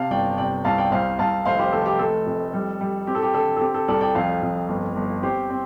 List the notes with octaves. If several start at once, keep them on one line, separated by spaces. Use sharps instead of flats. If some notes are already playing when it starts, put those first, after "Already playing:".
Already playing: C3 F5 A5
G1 D5 G5
C3 D5 G5
C2 F5 A5
D5 G5
C2 C5 F5
C2 F5 A5
F1 C5 F5
G4 C5
F1 A4
G4
A3 A4
F2
G3
G3
C4 G4
A4
G4
D3 A4
A4
C4 G4
A4
C2 A4 D5
D5 G5
F2 C5 F5
F2
G1
G1
C4 G4 C5
C4